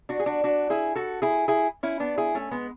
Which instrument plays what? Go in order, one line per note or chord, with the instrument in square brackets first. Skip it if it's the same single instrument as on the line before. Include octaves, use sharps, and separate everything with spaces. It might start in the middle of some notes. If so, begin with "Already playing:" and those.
[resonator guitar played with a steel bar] D4 F#4
G#4
D4 F#4
D4 F#4
E4 G#4
F#4 A4
E4 G#4
E4 G#4
C#4 E4
B3 D4
E4 G#4
A3 C#4
G#3 B3